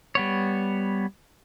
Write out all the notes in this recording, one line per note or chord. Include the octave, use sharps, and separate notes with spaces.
G3 B3 C#5